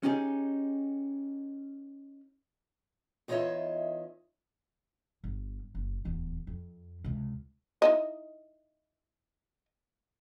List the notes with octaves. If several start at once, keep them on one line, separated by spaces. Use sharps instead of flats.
C#4 D#4 G4 G#4
E2 D#4 F4 C#5 D#5 E5
G1
F#1
D1 E2
F2
C#2 C3
D#4 E4 D#5